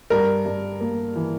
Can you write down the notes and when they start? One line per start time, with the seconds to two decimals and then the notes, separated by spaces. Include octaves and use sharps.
0.10 G2 A#4
0.45 G2
0.81 A#3
1.16 E3